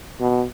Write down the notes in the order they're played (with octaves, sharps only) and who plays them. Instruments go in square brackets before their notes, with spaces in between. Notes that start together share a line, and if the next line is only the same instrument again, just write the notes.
[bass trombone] B2